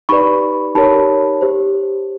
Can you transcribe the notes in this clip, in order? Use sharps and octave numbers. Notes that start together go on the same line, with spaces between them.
D#4 G4 B4 D5 B5 C#6
D#4 G4 A#4 C#5 A5 B5
G4 C5